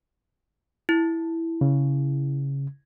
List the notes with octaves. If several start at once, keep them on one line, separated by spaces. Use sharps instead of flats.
E4
C#3